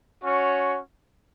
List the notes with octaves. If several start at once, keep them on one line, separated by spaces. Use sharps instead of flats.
C#4 F#4 C#5